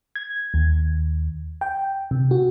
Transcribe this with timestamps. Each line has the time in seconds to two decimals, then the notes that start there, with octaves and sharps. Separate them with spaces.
0.16 G#6
0.54 D#2
1.61 G5
2.11 C3
2.31 F#4